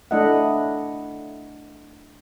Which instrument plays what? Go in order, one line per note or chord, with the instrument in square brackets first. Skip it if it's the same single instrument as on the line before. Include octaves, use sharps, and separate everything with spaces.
[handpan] A3 D4 E4 D#5 E5 F#5